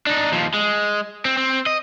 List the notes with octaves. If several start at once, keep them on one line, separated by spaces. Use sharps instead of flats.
D4 D#4
D#2 F3
G#3
C4
C4
D#5